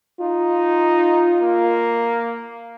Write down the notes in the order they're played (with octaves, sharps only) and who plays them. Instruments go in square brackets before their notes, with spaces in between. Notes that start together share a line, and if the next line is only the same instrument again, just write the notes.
[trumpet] D#4 [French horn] F4
[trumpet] A#3